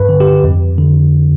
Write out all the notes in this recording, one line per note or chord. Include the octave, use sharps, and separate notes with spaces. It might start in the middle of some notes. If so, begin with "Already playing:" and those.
Already playing: G2 B4
D3
G4
F2
D3